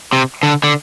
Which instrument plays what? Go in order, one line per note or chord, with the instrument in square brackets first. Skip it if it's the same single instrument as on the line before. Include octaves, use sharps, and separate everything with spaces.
[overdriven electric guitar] C3
D3
D3